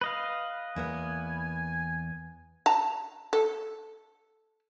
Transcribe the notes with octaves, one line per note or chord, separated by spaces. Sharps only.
B4 D#5 F5
E2 A#3 B3 G#5
A5 A#5
A4